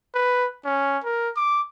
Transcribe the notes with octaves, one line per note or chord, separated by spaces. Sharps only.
B4
C#4
A#4
D6